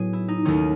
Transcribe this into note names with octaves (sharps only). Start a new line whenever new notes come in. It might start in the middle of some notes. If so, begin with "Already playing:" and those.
Already playing: A2 F#3 B3 G#4
E4
D#4
D#2 D#3 A3 C#4